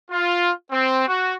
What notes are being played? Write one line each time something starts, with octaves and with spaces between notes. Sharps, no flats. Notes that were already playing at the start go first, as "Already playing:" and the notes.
F4
C4
F#4